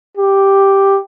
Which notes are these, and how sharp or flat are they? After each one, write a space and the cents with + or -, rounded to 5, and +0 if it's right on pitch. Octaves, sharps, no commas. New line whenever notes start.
G4 +0